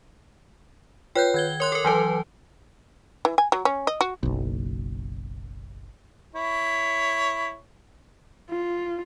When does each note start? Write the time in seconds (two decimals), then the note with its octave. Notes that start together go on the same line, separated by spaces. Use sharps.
1.15 F4 B4 C#5 G5 F#6 G6
1.34 D#3 G#6 G7
1.60 A#4 C#5 C6 F#6
1.72 A4 A#4
1.85 E3 F#3 A4 B4 G#5
3.25 E3
3.38 G#5
3.52 F#3
3.65 C#4
3.87 D#5
4.01 F#4
4.23 F#1 B1
6.35 E4 C#5
8.50 F4